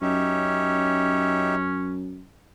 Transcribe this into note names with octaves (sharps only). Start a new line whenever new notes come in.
F#2 C#4 D#4 G4 E5